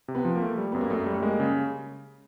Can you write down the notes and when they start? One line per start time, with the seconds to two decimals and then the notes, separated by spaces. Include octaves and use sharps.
0.08 C3
0.15 B3
0.25 F3
0.35 A#3
0.42 A3
0.58 G3
0.72 F#2 B3
0.81 A#3
0.90 F#2 A3
1.06 G3
1.22 G#3 A#3
1.40 C#3